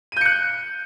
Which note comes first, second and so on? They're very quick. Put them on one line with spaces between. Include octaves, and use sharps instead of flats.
D#7 G6 C#7 F#6